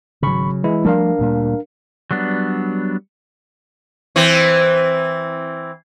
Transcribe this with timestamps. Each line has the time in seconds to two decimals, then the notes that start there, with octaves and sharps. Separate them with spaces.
0.23 G#1 C#3 F#3 B5 C#6
0.64 E3 G#3 E4
0.85 F3 G3 A3 D4 A#4 F5
1.19 D2 A#2 G3
2.11 F#3 G3 B3 D4
4.16 E3 C4